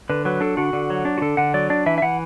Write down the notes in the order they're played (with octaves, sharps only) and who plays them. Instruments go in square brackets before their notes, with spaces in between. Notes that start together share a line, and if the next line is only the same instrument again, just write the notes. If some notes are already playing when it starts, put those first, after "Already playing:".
[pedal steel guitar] D3 B4
F#3 B4
D4 A4
D3 F#4
D3
F#3
D4
F#4
D3 A4
D3 F#5
F#3 D5
D4 D5
E3 E5
E5
E3 F#5